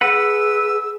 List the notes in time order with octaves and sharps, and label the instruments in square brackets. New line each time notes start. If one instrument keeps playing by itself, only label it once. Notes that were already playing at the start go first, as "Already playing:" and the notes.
[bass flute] G#4 [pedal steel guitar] B4 F#5 [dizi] E6